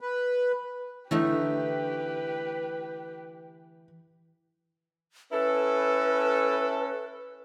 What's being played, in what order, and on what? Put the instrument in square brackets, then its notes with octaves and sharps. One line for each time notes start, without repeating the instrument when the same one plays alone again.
[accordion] B4
[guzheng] D3 A3 D#4 [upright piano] E3 [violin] G4 B4
[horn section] C#4 E4 A4 [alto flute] B4